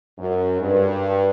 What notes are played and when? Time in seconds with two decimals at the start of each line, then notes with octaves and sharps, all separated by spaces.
0.19 F#2
0.61 G2